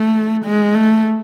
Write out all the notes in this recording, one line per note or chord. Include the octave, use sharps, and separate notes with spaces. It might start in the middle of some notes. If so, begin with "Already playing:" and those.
Already playing: A3
G#3
A3